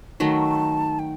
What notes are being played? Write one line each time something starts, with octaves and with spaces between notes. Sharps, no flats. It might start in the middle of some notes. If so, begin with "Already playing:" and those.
D#3 F#3 A3 A5
G5